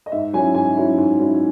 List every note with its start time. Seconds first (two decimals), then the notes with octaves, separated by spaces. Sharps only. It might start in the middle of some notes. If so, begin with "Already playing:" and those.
0.06 D#5
0.12 G#2 E5
0.33 F#3 C#4 E4 G#5
0.54 G#2 G#5
0.77 F#3 C#4 E4
0.97 G#2
1.20 F#3 C#4 E4